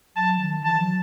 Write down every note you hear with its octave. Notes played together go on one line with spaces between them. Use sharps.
F#3 A5
D#3
E3 A5
F#3